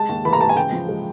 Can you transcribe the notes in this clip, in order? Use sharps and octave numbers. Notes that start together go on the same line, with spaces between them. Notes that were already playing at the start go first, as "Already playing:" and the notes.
Already playing: G#3 A5
D#2
E3 B5
A#5
G#3 A5
G#5
C#3 G5
F3
G#3